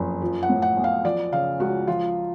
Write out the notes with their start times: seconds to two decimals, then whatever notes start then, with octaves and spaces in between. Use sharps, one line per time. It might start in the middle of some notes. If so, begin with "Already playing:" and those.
Already playing: F#1 F2
0.22 F3
0.43 F#5
0.49 A2
0.62 F#5
0.77 B1
0.84 F5
1.05 F3 D5
1.32 C#3 F5
1.60 C#2 F#4
1.87 F3 F4